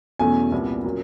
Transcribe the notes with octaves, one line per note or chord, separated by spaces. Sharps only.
E2 B2 F#3 A3 C#4 G#5
C2 A#2 G3 B3
A#2 F#3 A#3 C#4